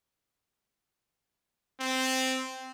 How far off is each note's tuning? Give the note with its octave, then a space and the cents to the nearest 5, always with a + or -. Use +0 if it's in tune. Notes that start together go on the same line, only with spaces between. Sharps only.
C4 -5